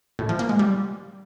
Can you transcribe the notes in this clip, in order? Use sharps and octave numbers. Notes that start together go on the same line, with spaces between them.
A2
F3
A#3
G#3
G3